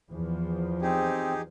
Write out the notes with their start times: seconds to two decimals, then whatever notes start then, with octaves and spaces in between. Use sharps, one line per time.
0.11 E2 F3
0.82 C4 D#4 G4 G#4